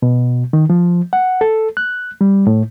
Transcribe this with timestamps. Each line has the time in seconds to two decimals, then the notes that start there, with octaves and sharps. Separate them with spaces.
0.02 B2
0.53 D#3
0.70 F3
1.13 F#5
1.41 A4
1.77 F#6
2.21 G3
2.47 A2